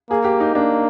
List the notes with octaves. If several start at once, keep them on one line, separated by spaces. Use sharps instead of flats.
A#3 G#4
G4
D#4
A#3 D4